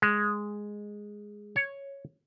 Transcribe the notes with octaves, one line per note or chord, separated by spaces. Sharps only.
G#3
C#5